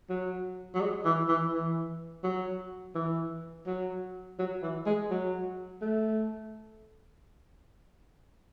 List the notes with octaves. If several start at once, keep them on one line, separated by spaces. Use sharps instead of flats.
F#3
F#3
G#3
E3
E3
E3
F#3
E3
F#3
F#3
E3
G#3
F#3
A3